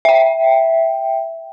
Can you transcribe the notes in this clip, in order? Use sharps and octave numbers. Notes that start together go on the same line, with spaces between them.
E5 G5